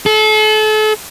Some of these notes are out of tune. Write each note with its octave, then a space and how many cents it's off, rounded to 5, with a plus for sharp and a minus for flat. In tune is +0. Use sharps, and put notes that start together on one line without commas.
A4 -35